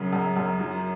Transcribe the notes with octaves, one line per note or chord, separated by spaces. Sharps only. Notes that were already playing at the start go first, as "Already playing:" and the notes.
Already playing: F#2 C#3
F#2
F#2
F#3